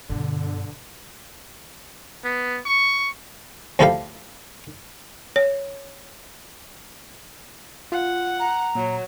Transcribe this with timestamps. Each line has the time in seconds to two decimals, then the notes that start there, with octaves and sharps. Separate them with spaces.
0.09 G2 B2 D3
2.24 B3
2.66 C#6
3.79 D2 F3 E4 G4 A4 F5
5.36 C#5
7.92 F4 F#5
8.40 A#5
8.75 A#2 F#3